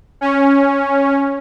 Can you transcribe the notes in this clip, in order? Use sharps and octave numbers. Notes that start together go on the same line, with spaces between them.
C#4